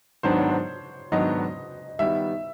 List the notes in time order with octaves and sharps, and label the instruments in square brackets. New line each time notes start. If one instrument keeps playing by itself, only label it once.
[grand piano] G#2 D#3 F#3 B3 D4 [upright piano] C5
[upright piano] C#5
C5
[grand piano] G#2 D#3 F#3 B3 D4 [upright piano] D#5
[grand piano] D#3 G3 B3 [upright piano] E5